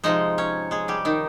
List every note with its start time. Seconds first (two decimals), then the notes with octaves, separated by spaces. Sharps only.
0.04 C3 F3 G#3 D#4 D#5
0.38 C#4 C#5
0.71 G#3 G#4
0.88 G3 G4
1.05 D#3 D#4